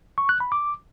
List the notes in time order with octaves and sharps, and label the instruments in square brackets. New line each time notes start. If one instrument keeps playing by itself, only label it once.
[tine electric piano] C#6
F#6
B5
D6